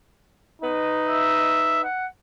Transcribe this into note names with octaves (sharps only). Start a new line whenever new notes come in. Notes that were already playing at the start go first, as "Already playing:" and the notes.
D#4 B4 D#5
E5
F#5